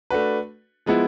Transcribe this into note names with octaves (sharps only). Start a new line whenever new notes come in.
A3 D4 F#4 B4
F3 G#3 B3 E4